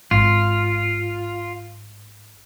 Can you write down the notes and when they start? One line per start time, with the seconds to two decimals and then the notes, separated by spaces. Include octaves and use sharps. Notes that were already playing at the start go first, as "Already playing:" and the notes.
0.11 G#1 F4